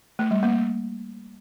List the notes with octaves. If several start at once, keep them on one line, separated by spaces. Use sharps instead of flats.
A3
G3
A#3